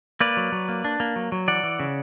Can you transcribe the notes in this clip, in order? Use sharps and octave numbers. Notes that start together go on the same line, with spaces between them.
A#3 B4 D5
F#3
F#3
A#3
D4
A#3
F#3
F#3
E3 D5 F#5
E3
C#3